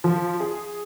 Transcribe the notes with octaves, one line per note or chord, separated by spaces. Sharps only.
F3
G#4